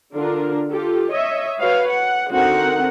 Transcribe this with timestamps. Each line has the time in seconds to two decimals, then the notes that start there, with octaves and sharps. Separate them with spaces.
0.15 D3 D4 F4 A#4
0.71 F4 G4 A4
1.11 C#5 D#5 E5
1.60 F#4 B4 C#5 F5
1.91 F#5
2.31 D3 C4 D#4 F#4 A#4 F#5